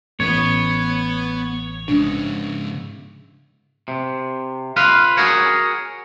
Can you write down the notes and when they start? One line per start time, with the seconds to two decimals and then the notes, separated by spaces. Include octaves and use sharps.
0.20 A1 B3 B4 C#5
1.88 G#2 C#3 D4
3.88 C3
4.77 F4 B4 F5
5.17 F#4 G#4 A#4 C#5